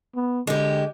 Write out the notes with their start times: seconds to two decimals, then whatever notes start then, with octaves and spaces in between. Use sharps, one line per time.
0.15 B3
0.47 D3 G#3 G4